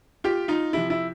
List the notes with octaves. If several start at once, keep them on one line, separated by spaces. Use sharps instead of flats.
F4 G4
D#4 F4
C3 F3 E4
E4